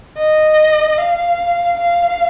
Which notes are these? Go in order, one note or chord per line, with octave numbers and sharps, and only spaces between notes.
D#5
F5
F5